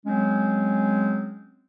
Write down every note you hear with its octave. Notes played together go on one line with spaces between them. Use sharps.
F#3 G#3 C4 C#4